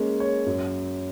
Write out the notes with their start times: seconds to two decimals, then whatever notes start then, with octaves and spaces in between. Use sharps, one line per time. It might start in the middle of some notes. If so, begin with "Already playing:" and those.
Already playing: G#3 A#3 C#4
0.20 C#5
0.46 F#2